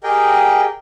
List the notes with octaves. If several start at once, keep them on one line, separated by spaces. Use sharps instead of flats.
G4 G#4 A#4 D#5 G5